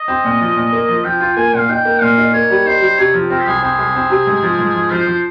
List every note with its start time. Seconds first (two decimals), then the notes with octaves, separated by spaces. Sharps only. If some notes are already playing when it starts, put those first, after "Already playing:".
Already playing: D#5
0.08 C4
0.25 A#2
0.41 F3
0.56 A#2
0.73 A#3
0.89 F3
1.05 F3 G5
1.20 F4
1.37 A#3 G#5
1.53 A#2 F5
1.69 D#4 G5
1.85 A#3
2.01 A#2 F5
2.18 D#4
2.33 A#3 C#5
2.50 G3
2.66 D#4 C5
2.81 G3
2.98 C3 C#5
3.14 F3
3.30 C4 A#4
3.40 G4
3.46 C2 G#4
3.62 C4 G#4
3.78 C2
3.95 C4
4.10 C3
4.27 G#2
4.43 F3
4.59 G#2
4.75 F3
4.91 F3 C5
5.07 F3